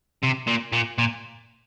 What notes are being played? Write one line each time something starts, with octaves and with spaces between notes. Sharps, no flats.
C3
A#2
A#2
A#2